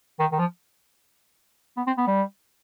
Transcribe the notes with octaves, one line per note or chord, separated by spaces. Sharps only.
D#3
D#3
F3
B3
C4
B3
G3